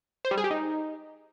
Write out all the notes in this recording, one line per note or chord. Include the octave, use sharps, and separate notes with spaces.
C5
G3
G#4
G4
D#4